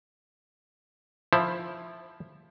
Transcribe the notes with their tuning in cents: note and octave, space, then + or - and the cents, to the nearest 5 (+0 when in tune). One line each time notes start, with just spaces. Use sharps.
F3 +0 E4 +0 C5 +20